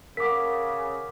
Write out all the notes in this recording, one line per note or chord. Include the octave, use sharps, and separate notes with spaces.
C#3 A#4 F#5 D6 B6